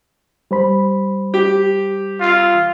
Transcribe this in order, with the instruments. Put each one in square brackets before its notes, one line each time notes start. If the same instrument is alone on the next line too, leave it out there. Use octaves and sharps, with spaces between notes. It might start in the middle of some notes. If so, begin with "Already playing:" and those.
[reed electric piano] G3 C5 B5
[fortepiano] G4
[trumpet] F4